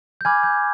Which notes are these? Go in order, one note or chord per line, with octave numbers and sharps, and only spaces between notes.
G6
G#5 B5 D6 F6 G#6
G6